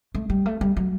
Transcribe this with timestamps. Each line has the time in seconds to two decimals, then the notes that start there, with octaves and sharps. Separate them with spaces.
0.15 A3
0.30 G3
0.46 A3
0.61 G3
0.77 F#3